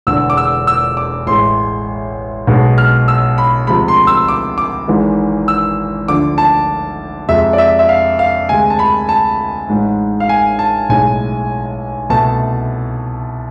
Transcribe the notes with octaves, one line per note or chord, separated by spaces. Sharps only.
E1 E2 D3 E6
D6
E6
E6
D6
A1 A2 G#3 C6
B1 B2 G#3
F6
E6
B5
D2 C3 F3 G#3 B5
C6
E6
D6
D6
G#1 G#2 E3 G#3
E6
D2 D3 F3 D6
A5
F2 C3 G#3 E5
D5
E5
E5
F5
F5
D2 C3 G#3 G#5
A5
B5
A5
A1 G#2 G#3
F5
G#5
A5
B1 A2 G#3 G#5
C2 B2 A3 A5